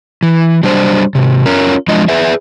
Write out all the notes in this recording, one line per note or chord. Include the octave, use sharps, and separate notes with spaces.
E3
F#3 G3 D4 C5
G#2 C3
C#4 F4 A#4
F3 G#3 D4 F4 D#5
G#4 B4 E5